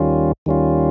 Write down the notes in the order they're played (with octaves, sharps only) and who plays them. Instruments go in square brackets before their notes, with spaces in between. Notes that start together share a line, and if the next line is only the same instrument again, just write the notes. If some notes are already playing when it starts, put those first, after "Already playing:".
Already playing: [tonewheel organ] D#2 D#3 G3 C#4 F4
D#2 D#3 G3 C#4 F4